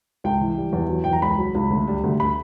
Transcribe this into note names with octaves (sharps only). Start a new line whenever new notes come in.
C#2 G5
E3
G3
E2
F#3
E2 G5
A#5
C#2 B5
F#3
C#2
D2
G3
D2
B5